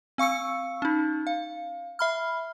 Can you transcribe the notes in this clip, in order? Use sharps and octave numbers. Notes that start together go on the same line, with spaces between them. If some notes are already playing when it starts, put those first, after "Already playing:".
C4 F5 C#6 E6 C#7
C#4 D#4
F5
E5 B5 F6